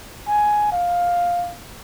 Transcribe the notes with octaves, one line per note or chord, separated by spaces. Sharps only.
G#5
F5